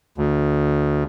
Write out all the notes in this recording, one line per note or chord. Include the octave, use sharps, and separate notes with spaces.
D2